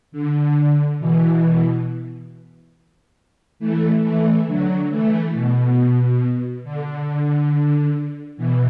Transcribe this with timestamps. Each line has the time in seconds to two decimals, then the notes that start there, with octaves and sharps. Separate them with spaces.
0.12 D3
1.00 B2 E3
3.59 E3 A3
4.03 E3 A3
4.47 D3 F#3
4.90 E3 A3
5.33 B2
6.64 D3
8.37 B2 E3